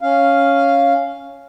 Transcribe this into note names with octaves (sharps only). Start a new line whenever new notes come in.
C#4 F5